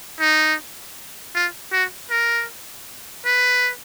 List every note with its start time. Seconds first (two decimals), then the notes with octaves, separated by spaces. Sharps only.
0.20 D#4
1.35 F4
1.72 F#4
2.11 A#4
3.25 B4